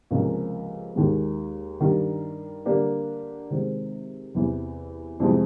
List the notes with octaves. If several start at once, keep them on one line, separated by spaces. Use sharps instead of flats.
C#2 C3 F3 A#3 C#4
D#2 D#3 G#3
G2 D#3 G3
D3 G3 A#3 D4 G4
C3 D#3 G#3 C4
E2 C3 E3
F2 C3 E3 G#3 C4